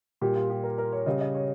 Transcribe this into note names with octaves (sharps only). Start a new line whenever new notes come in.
A#2 G3 G4
F4
G4
A#4
A#4
C#5
C#3 G3 D#5
D#5
C#5